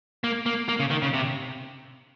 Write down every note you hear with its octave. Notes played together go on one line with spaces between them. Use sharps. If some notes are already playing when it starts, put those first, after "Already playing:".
A#3
A#3
A#3
C#3
D#3
C#3
C3